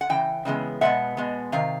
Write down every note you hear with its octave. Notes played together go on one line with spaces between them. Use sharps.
F#5
C#3 E3 G5
C#3 E3 G#3 B3
B2 G#3 B3 E5 F#5
B2 G#3 B3
C3 D#3 F5